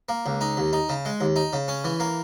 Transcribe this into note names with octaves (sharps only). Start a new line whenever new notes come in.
A#3
C#2
D#4
D#2
D#4
C#3
G#3
D#2
D#4
C#3
C#4
E3
A#3